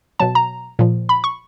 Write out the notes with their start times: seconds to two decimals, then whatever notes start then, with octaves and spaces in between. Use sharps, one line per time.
0.20 B2 F#3 A5
0.35 A#5
0.79 A#2 F3
1.09 B5
1.24 C#6